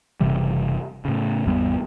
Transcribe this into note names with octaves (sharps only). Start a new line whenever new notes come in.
F#1 C3 E3 G3
A2 C#3
G#1 E2 G3 B3